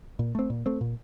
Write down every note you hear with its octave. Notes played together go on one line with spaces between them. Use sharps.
A#2
A3 C4
A#2
A3 C4
A#2